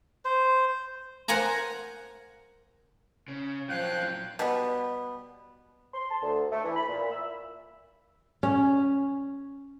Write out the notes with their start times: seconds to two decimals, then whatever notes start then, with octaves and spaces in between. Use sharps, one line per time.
0.25 C5
1.28 A#4 C5 F#5 G#5 A#5
3.28 C#3
3.69 A#2 F3 F#3 F5 G5 F#6
4.39 B2 G3 B3
5.93 C6
6.10 A5
6.22 D2
6.51 A3
6.64 E3
6.75 B5
6.88 A#2
7.10 E5
8.43 C#4